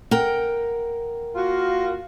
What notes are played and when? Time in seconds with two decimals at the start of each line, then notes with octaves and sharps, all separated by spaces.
0.11 A#4 F#5 G5
1.35 A#3 F4 F#4